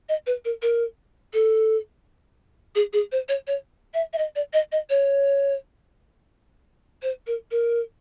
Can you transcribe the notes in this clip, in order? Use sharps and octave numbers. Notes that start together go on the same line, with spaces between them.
D#5
B4
A#4
A#4
A4
G#4
G#4
C5
C#5
C#5
E5
E5
D#5
D5
D#5
D#5
C#5
C5
A#4
A#4